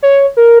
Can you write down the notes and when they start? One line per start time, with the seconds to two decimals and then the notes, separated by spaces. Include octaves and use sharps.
0.03 C#5
0.37 A#4